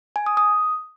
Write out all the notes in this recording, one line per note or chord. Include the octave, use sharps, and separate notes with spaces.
G#5
D#6
D#6